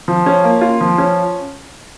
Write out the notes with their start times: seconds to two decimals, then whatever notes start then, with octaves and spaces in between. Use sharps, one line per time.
0.08 F3
0.26 C#4
0.44 A#3
0.61 F4
0.81 F3
0.98 C#4